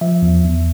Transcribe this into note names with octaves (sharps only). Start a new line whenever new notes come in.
F3 E5
E2
E2